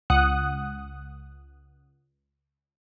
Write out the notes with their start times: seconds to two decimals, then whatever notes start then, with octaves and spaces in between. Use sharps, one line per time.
0.10 C#2 F#5 D#6 F#6